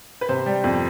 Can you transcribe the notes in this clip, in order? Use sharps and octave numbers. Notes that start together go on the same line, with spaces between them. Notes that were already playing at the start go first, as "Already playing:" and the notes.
B4
C3 C5
G3
F2